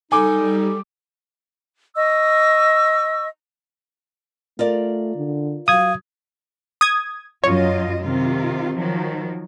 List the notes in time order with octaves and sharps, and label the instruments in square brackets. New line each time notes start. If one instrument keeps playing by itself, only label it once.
[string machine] G3 [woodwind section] D#4 [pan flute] A4 [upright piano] G#5 D6
[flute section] D#5 C#6 E6
[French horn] A3 [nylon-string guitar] F4 A#4 D5
[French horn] D3
[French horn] F#3 [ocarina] F5 [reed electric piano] D#6 G#6
[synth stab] D#6 G#6
[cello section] F#2 F4 D#5 [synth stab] C#5
[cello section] C3 D#3 F4
D#3 F3 F#3